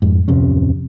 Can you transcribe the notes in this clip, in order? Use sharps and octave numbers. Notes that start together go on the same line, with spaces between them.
F2 G#2
D1 F2 C3 C#4